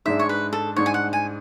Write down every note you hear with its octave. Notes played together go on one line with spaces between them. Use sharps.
G#2 G#3 D4 E5
C#5
B4
A4
G#2 G#3 D4 C#5
G#5
F#5
G#5